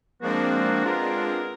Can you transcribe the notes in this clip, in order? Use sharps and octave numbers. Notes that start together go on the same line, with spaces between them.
F3 G#3 A#3 C4 D4 F#4
B3 F4 G#4 A#4